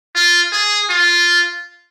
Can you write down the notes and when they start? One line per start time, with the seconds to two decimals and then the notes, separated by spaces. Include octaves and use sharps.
0.15 F4
0.52 G#4
0.89 F4